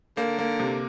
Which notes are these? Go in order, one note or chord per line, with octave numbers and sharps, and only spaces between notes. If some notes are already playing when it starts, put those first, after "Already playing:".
D3 A#3
A#3
C3